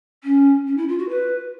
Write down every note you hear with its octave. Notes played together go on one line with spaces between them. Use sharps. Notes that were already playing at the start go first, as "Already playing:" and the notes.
C#4
C#4
E4
F4
F#4
B4